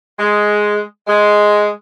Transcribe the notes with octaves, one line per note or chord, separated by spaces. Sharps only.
G#3
G#3